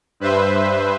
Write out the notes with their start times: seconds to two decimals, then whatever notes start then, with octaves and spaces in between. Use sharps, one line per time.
0.20 G2 B4 C5 E5